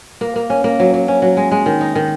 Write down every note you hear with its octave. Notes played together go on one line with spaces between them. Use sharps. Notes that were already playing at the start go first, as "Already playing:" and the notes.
A#3
A#3
C#4
A#3
F#3
F#3
C#4
F#3
G#3
G#3
D#3
D#4
D#3